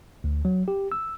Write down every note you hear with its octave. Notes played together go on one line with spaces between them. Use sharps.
D2
F#3
G4
E6